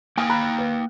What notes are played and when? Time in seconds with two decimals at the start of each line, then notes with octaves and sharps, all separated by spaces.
0.18 A#3 G5 G#5 D#6 F6
0.29 A#5 B5 F#6
0.58 B4